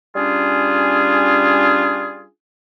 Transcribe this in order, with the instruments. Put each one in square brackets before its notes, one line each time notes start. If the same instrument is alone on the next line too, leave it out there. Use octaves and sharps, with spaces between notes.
[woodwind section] G3 C#4 D4 F4 G#4